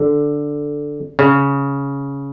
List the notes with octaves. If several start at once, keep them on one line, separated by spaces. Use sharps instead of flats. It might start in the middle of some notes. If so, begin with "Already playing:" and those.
Already playing: D3
C#3